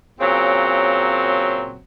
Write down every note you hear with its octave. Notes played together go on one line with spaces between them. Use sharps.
A#2 C#3 F#3 C4